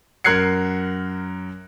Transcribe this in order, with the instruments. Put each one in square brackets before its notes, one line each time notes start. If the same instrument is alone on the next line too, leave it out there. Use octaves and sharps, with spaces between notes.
[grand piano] F#2 A#4 F#6 G#6 C7 C#7